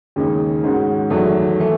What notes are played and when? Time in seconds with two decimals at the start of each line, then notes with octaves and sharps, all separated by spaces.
0.16 D#2 C#3 G#3 D#4
0.64 G#2 D#3 G#3 C#4 F#4
1.10 E2 D#3 F#3 A3
1.59 E3 A3